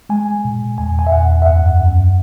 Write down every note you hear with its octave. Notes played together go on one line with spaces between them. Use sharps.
G#3 G#5
A#2
E2 G#5
G#5
E5
E2 F#5
E5
F#2 F#5
F#2